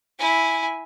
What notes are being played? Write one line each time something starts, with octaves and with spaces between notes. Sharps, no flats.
E4 G#5